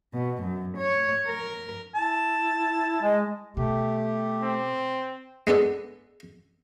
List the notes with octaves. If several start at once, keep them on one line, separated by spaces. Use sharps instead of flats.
B2
F#2
C#5
A#4
E4 A5
G#3 D#5 G#5
B2 A3 G4
C4
G#3 B3 D4 A4